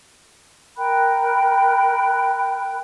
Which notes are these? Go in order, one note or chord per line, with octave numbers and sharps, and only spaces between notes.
A#4 G5 B5 F#6